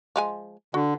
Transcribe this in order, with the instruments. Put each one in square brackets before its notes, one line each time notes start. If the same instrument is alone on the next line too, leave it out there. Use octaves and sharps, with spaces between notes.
[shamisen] F3 G#3 G#5
[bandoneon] D3 [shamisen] F#4